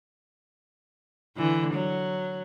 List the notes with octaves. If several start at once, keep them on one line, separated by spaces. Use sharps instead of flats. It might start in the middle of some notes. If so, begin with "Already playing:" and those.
D3 E3
F#3